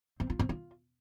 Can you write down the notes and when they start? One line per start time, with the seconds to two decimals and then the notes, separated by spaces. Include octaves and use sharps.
0.20 C4
0.30 F4
0.39 C4
0.49 F4